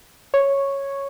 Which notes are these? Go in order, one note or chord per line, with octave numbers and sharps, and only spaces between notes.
C#5